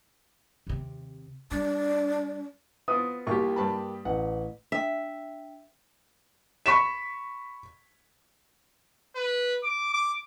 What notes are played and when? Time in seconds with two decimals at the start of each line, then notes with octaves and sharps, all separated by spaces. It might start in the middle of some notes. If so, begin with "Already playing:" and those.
0.67 D#2 C3
1.51 G3 D4
2.88 B3 C4 F4 D#6
3.27 C2 A#3 F4 G4 C#6
3.56 G2 A5 B5
4.05 A1 F#5
4.72 D4 E5 G5
6.66 B5 C#6 B6 E7
9.15 B4
9.63 D6
9.93 D6